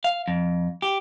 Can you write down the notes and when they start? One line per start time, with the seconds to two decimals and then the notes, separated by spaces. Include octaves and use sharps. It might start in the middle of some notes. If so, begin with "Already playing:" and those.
0.04 F5
0.28 F2
0.82 G4